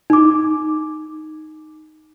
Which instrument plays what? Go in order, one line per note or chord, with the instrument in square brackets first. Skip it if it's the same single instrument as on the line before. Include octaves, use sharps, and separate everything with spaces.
[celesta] D#4 D6